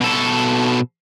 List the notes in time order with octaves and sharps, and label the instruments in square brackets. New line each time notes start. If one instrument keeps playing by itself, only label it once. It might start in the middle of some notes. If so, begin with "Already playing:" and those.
[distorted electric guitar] B2 A4